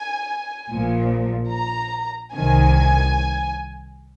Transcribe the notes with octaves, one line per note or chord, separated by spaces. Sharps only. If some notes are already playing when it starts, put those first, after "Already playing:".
Already playing: G#5
A#1 A#2 F3
A#5
C2 C3 D#3 G#5